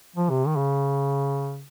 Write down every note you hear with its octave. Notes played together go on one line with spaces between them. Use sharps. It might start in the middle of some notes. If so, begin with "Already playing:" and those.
F3
C3
D#3
C#3